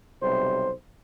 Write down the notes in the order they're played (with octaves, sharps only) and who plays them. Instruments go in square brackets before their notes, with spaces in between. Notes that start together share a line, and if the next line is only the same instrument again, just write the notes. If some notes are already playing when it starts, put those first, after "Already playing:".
[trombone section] B1 C3 G3 C5